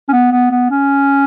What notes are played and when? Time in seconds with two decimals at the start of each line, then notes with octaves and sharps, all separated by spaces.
0.09 C#4
0.13 B3
0.32 B3
0.51 B3
0.70 C#4